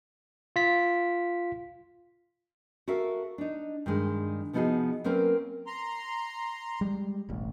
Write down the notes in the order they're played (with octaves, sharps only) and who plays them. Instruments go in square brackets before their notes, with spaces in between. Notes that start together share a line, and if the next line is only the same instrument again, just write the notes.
[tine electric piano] F4 B6
[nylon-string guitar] F#4 A4 A#4 E5 F5
D4 D#4
G2 D#3 G#3
C3 F3 B3 D#4 F#4 G#4
F#3 A#3 C4 C#4 A#4 B4
[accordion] A#5 C6
[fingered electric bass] G3 G#3
E1 A1